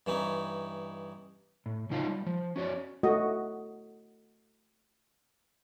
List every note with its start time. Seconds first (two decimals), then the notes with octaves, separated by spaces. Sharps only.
0.06 G2 E3 C#4 D#4
1.66 A2
1.90 C#3 F#3 D#4 F4 F5 A5
2.07 G3
2.26 F3
2.56 C#4 F#4 C#5 D5
3.03 A3 F#4 D#5